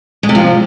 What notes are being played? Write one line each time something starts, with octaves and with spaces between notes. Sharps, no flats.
G#3
C3
F3